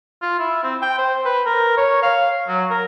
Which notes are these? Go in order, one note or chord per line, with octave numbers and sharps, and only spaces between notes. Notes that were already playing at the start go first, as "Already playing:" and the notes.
F4
E4
C4
G5
C5
B4
A#4
C#5
F5
F#3
A#4